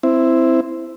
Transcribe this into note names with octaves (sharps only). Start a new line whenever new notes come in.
C4 E4